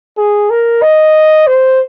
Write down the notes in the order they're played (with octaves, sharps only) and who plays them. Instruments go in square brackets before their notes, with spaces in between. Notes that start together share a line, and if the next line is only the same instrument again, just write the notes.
[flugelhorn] G#4
A#4
D#5
C5